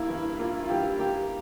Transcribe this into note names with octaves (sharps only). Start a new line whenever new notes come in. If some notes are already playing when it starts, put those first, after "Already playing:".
Already playing: G2 A#3 E4
E3
A#3 F4
F4
E3 G4
A#3 G4